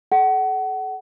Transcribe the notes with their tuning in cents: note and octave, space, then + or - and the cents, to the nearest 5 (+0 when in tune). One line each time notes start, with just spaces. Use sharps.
A4 -45 F#5 +30